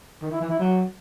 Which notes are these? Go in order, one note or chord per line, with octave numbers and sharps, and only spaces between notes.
D#3
E4
E3
E4
F#3